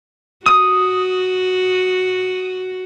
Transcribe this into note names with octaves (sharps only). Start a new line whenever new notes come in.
F#4 D#6